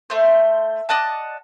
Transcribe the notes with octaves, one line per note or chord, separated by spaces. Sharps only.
A3 C5
D5 D#5 F#5 A5